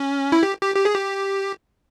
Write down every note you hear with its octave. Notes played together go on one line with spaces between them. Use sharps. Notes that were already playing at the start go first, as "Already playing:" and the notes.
Already playing: C#4
E4
G4
G4
G4
G#4
G4